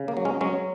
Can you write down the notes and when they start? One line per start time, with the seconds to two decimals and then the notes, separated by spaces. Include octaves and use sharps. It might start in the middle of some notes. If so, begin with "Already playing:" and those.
Already playing: C#3
0.08 A#3
0.17 F#3
0.25 G#3 C#4
0.41 F#3 G#3 C#4